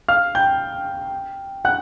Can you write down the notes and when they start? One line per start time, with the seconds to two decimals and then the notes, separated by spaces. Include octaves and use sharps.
0.08 F5 F6
0.35 G5 G6
1.65 F#5 F#6